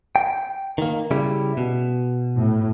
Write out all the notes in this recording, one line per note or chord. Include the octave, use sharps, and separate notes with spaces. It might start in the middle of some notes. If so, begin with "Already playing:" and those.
G5
D#3 A#3
C#3 G3 E4
B2
A2